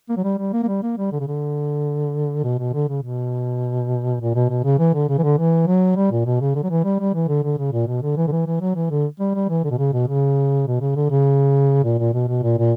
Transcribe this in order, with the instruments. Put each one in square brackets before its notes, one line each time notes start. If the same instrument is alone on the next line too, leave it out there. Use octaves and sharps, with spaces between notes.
[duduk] A#3
F#3
G3
G3
A#3
A#3
G3
A#3
G3
D3
C#3
D3
B2
B2
D3
C#3
B2
A#2
B2
B2
C#3
E3
D3
C#3
E3
D3
E3
F#3
G3
A#2
B2
C#3
D3
F#3
E3
G3
G3
E3
D3
D3
C#3
A#2
B2
D3
E3
D3
E3
E3
F#3
E3
D3
G3
G3
E3
D3
B2
C#3
B2
C#3
B2
C#3
D3
C#3
A#2
A#2
B2
B2
A#2
A#2